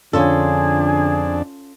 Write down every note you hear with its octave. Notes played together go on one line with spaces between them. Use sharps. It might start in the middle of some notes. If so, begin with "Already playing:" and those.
F2 D3 C#4 D4 F4 G#4 A4